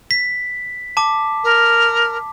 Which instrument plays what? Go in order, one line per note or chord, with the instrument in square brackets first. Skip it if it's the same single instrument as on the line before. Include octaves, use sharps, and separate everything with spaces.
[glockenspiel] B6
A5 D6
[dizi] A#4